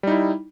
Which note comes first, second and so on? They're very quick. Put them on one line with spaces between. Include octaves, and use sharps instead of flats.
G3 D#4 E4